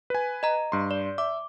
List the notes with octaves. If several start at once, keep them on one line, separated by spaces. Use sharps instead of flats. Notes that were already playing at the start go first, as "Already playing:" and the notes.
B4 G#5
D#5 A#5
G2 C6
D5
E5 D6